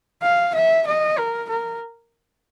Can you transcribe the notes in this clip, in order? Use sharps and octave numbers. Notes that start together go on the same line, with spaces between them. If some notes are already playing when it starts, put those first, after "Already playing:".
F5
E5
D#5
A#4
A#4